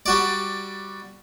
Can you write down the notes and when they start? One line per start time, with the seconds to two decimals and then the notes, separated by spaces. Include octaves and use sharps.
0.06 G3 F#4 D5